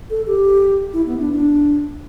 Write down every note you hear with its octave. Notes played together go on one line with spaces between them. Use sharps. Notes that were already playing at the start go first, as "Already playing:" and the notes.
A4
G4
E4
B3
D4
D4